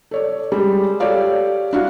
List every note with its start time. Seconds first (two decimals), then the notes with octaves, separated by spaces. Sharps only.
0.11 A4 C#5 D5
0.52 G3 G#3
1.00 G4 A4 C#5 D5 F5
1.73 D4 E4 F#4 F5